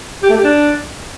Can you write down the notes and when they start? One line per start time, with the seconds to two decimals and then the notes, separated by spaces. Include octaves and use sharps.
0.23 G4
0.30 A3
0.37 G4
0.44 D4